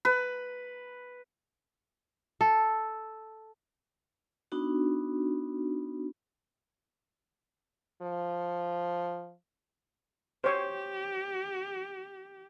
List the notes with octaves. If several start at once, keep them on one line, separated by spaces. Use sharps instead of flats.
B4
A4
B3 D4 D#4 F#4
F3
G4 C5 C#5